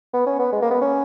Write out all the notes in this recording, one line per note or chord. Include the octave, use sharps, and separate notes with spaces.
B3
C#4
B3
G#3
A#3
B3
C#4